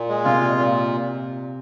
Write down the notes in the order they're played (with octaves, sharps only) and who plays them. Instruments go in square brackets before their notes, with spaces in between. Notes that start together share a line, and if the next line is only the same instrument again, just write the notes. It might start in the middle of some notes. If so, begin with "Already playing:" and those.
Already playing: [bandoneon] A#2 [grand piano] A#3
[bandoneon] G#3
[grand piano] C3 [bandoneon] F4
[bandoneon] A#2
A#2